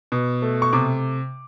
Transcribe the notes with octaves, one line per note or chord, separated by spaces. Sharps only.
B2
A3
C#6
C3 D6